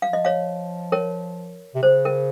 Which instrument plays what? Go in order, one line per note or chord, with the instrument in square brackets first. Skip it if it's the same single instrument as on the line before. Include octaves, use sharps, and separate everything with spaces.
[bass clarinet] F3 [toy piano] F5
[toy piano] D#5
C#5 F5
A#4 C#5
[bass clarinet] C3
[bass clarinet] C#3 [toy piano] C5
[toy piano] A#4